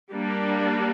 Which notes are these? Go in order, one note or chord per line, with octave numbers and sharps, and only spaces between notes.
G3 A#3 D4